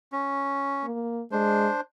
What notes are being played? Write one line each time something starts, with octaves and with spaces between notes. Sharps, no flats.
C#4
A#3
G#3 D4 C5